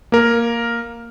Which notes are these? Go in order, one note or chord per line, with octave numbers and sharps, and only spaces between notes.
A#3 A#4